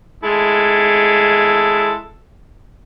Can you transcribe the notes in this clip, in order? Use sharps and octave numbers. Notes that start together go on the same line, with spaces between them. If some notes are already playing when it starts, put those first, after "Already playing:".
G#3 E4 A4